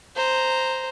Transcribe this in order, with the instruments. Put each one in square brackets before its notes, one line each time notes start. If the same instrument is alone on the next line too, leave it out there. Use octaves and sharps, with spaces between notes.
[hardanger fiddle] C5 A#5